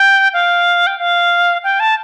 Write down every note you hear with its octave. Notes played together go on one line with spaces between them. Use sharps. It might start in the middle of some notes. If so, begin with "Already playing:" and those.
Already playing: G5
F5
G5
F5
G5
A5